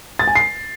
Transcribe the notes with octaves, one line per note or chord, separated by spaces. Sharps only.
A6
G#5
C7